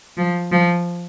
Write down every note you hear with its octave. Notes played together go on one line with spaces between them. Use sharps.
F3
F3